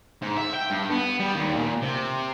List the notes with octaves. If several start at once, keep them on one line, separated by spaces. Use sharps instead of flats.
G#2
E5
G5
G2
B3
G3
D#2
A#2
C3